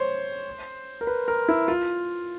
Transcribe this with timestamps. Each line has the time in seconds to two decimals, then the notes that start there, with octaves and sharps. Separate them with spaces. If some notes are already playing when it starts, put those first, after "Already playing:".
Already playing: C5 C#5
1.01 A#4
1.07 B4
1.28 A#4
1.48 E4
1.68 F4